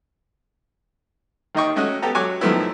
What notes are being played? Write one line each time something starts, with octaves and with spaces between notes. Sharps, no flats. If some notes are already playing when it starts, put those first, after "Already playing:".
D#2 D#3 D#4 D#5 G5 C#6
A3 C#4 F#4 D#5 F#5
B3 G4 A4 A#5
F#3 G#5 C#6 D6 F#6
F#2 D#3 F3 A3 B3 E4